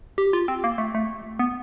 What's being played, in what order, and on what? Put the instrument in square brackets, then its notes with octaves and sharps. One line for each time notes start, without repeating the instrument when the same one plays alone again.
[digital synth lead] G4
F4
C4
A#3
A3
A3
B3